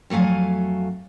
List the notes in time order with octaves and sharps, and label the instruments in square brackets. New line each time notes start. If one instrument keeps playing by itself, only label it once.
[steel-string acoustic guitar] F2 F#3 A3 F5 G#5